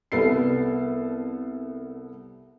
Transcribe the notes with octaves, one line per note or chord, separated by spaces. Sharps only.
C2 B3 A4 C7